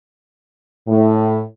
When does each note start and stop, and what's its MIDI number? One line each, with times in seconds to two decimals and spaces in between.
0.88 1.40 45